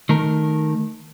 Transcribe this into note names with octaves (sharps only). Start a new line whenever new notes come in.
D#3 A3 A#4